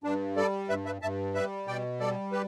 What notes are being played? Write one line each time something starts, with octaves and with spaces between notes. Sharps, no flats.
G2 D4
G3 A4 D5
G2 B4 E5
B4 E5
G2 E5 A5
G3 B4 E5
B2 D5 G5
G3 A4 D5
G4 B4